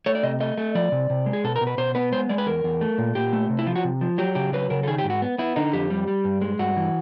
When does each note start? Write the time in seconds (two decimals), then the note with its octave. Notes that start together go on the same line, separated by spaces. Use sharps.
0.06 A3 C#5
0.15 D5
0.23 C3 D#5
0.40 A3 D#5
0.58 A3
0.75 F3 D5
0.92 C3
1.10 C3
1.26 G#3
1.33 G#4
1.44 B2 A4
1.56 A#4
1.61 B2
1.67 B4
1.78 B2 C5
1.95 B3 B4
2.12 G#3 C5
2.29 G#3 D5
2.38 B4
2.46 E2 A#4
2.64 E2
2.81 A3
2.98 A#2
3.15 A#2 G4
3.33 A3
3.50 C3
3.59 E4
3.67 F3 F4
3.76 F#4
3.84 C3
4.01 F3
4.18 F#3 G4
4.35 C#3 G4
4.53 F#3 B4
4.70 C#3 A#4
4.83 A4
4.87 D#3 G#4
4.98 G4
5.04 G#2
5.10 F#4
5.22 B3
5.38 B3 E4
5.56 D3 D#4
5.73 F2 G4
5.90 G3
6.07 G3
6.24 G2
6.41 G#3
6.59 G2 F#4
6.77 E3